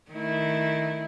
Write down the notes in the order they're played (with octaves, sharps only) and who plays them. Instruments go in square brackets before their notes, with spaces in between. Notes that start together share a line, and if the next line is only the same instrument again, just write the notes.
[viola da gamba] D#3 A3 E4